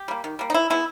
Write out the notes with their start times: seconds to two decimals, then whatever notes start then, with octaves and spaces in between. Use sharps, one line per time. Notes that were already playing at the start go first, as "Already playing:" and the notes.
Already playing: G4
0.08 G3 A#3
0.24 D#3
0.39 G3 A#3
0.50 D#4
0.54 E3 E4
0.70 G#3 B3 E4